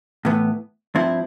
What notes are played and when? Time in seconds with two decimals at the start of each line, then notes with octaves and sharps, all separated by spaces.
0.25 A2 E3 B3
0.95 G2 F3 C4 E4